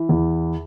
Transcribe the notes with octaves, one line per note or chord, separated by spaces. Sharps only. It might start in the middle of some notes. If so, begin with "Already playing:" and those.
Already playing: E3
E2